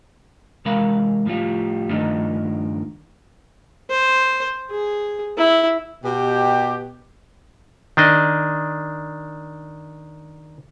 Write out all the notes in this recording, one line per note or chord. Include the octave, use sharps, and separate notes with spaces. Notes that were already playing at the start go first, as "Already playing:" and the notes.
C3 E3 G#3 A#4 F5 B5
A2 F3 G3 F4
G2 D#3 F3 A3 D4 D#4
C5
G#4
E4
B2 G4
D#3 D4 D#5